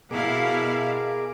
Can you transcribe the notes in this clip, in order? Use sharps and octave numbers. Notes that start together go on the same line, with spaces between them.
B2 E4 G#4 A#4 F5 D6